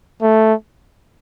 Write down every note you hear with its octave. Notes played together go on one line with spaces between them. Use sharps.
A3